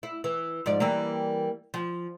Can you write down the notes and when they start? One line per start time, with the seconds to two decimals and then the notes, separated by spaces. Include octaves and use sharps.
0.03 E4
0.24 E3
0.66 G#2 F3 D5
0.80 E3 G3 A#3
1.74 F3